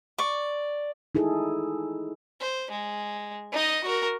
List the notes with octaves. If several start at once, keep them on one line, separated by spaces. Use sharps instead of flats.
D5 C#6
D#4 E4 G#4 A4
C5
G#3
D#4 D#5
F#4 A#4